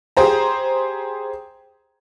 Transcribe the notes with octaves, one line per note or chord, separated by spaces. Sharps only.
G4 G#4 C5 A#5